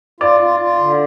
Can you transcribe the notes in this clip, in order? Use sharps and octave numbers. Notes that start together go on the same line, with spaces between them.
F4 D5
F4
F4
D3